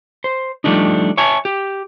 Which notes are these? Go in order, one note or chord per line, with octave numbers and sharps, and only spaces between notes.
C5
F3 G3 A3 D4 D#4
C#5 E5 G#5 A5
G4